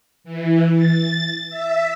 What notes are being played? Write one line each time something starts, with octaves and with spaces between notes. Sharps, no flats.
E3
A6
E5